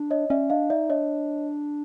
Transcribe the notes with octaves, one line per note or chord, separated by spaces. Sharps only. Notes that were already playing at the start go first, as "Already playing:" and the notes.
Already playing: D4
C#5 D#5
C#4 D5 E5
D4 D#5 F5
D#4 D5 E5
D4 C#5 D#5